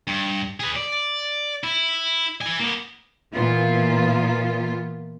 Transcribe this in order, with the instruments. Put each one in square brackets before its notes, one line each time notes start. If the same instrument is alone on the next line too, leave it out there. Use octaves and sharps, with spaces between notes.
[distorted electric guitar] G2
G#4 B4
D5
E4
E4 G#5
A#3 B3
[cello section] A#2 E3 A#3 B3 F4